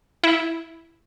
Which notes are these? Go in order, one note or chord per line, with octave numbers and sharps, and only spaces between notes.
E4